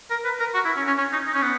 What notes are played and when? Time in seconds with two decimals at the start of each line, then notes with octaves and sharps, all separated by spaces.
0.11 A#4
0.25 B4
0.39 A#4
0.54 F#4
0.65 E4
0.77 C#4
0.87 C#4
0.98 C#4
1.13 D#4
1.27 D#4
1.34 C#4
1.42 B3